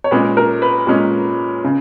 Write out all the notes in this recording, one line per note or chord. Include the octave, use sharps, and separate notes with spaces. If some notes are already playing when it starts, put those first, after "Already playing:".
C#5
A#2 G#3 C#4 B4
A#4
B4
A#2 G#3 C#4
C#3